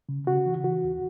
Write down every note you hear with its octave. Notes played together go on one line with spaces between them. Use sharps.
C#3
C#3 F#4
E3
E3 F#4
D#2